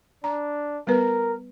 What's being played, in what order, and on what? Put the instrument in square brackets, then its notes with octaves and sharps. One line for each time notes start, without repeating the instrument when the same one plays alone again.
[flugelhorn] D4 [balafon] A#5
[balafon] G3 B3 B4 [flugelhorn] A#4